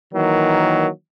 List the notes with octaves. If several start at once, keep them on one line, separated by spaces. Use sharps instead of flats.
D#3 E3 F#3 A#3